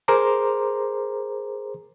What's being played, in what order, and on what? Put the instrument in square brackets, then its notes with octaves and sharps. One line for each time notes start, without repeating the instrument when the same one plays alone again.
[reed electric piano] G#4 A#4 C5 A#5 C6 D6